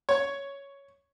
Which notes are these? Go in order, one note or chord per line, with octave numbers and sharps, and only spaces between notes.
C#5